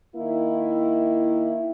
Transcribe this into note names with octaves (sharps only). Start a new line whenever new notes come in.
D#3 A#3 E4